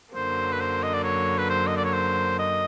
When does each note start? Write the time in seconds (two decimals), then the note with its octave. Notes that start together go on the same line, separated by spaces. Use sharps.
0.14 F#2 D3 F#3 A#3 C5
0.52 B4
0.60 C5
0.83 D#5
0.94 D5
1.04 C#5
1.38 B4
1.49 C5
1.67 D#5
1.77 D5
1.85 C#5
1.93 C5
2.39 D#5